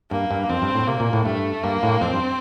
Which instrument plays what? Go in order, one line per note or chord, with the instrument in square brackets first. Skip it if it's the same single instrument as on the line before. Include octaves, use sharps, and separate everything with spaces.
[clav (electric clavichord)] G2 [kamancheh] A#3
[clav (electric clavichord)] G2
[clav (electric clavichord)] F2 [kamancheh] C4
[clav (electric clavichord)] G2
A2
[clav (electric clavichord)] C3 [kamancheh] A#3
[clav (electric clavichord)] A#2
A2
[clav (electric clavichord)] G2 [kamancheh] A3
[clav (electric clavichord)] G2 [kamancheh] A#3
[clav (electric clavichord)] A2
[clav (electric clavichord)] F2 [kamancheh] C4
[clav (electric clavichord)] G2